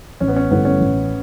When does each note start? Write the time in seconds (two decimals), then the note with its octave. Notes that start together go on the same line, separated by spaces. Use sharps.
0.20 A1 C#4
0.28 B3
0.36 C#4
0.51 G2 D3 A3 B3 E4
0.65 C#4
0.80 A1